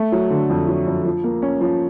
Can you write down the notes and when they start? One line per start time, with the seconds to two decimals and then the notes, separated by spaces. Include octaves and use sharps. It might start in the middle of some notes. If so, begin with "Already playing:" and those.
Already playing: A3
0.12 F#3
0.31 D3
0.49 F2
0.68 F#3
0.87 F2
1.05 F3
1.24 A#3
1.42 C#4
1.61 F3